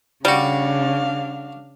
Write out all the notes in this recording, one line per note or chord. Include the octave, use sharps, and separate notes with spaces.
C#3 G3 D4 F#4 F5 D6